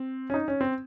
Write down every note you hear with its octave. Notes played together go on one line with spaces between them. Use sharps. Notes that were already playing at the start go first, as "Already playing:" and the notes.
Already playing: C4
C#4
D#4
C#4
C4